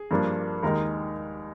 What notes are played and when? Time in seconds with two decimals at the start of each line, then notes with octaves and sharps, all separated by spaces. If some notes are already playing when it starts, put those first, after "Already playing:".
Already playing: G#4
0.11 G2 F3 A#3 D4
0.62 D#2 D#3 G#3 D#4 A#4